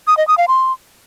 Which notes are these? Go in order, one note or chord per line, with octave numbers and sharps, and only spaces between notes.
D#6
D#5
D#6
F5
C6